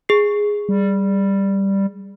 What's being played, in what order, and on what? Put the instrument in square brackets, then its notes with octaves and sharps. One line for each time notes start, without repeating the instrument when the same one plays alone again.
[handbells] G#4 C7
[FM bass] G3